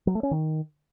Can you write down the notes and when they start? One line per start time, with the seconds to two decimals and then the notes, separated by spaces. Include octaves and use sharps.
0.07 F#3
0.15 A3
0.23 C#4
0.31 D#3